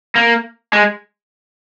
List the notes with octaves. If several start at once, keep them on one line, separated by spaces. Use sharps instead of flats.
A#3
G#3